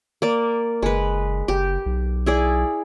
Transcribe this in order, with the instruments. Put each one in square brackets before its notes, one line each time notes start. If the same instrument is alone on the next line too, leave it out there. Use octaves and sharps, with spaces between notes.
[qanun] A#3 D5
[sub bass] F#1 [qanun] G#3 B4
[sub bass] F#1 [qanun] G4
[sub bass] B1
[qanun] E4 G#4 D5